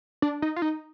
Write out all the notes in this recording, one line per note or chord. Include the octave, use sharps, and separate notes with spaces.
D4
D#4
F4
D#4